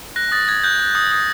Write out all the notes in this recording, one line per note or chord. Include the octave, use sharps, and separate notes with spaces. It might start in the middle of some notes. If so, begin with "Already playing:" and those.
F#6 A#6
D#6 A6
D#6 G#6
F#6 G6
F#6
D#6
D#6